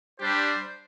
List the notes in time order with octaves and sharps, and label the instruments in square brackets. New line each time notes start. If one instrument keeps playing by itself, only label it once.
[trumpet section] G3 D4 G4 C5